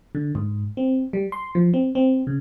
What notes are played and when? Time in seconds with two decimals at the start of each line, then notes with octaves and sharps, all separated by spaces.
0.15 D3
0.35 G#2
0.77 C4
1.13 G3
1.32 C6
1.55 F3
1.74 C4
1.95 C4
2.27 C#3